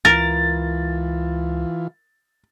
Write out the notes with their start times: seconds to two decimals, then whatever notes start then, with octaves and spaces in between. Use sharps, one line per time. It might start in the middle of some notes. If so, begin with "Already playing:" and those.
0.05 C#2 E3 F4 A#4 A6